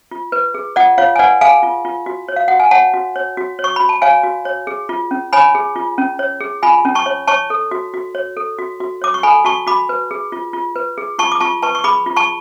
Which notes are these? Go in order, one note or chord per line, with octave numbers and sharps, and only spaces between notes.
F4
B4
G#4
F4 D5 F#5
F4 C#5 F5
G#5
B4 D5 F#5
G#4 F5 G#5
F4
F4
F#4
C#5
F5
F#4 F#5
G#5
C#5 F#5 A5
F#4
C#5
F#4
C#5
C#6
F#4 B5
A5
C#5 F5 G#5
F#4
C#5
G#4
F4
C#4
C#5 G#5 B5
G#4
F4
C#4
C#5
G#4
F4 G#5 B5
C#4
A5 C#6
C#5
C#5 A5 C#6
A4
F#4
F#4
C#5
A4
F#4
F#4
C#5 D6
C#6
A4 G#5 B5
F#4 A5 C#6
F#4 B5 D6
B4
G#4
F4
F4
B4
G#4
F4 A5 C#6
D6
F4 A5 C#6
B4 A5 C#6
C#6
G#4 B5 D6
F4
A5 C#6